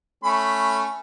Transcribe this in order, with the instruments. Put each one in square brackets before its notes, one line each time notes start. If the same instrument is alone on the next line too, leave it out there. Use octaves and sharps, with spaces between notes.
[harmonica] A3 C#4 B5